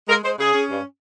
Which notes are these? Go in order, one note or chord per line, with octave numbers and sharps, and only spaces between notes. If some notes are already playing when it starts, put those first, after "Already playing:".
G#3 A#4
G#3 C5
C#3 G#4
C#4
G2